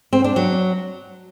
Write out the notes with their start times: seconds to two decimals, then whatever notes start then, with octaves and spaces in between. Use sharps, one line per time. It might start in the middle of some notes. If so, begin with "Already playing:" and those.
0.13 C4
0.24 D4
0.36 F#3